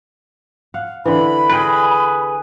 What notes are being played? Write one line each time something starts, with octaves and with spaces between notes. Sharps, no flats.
F5 F#5
D3 E3 B5
G#4 A#4 B4 G5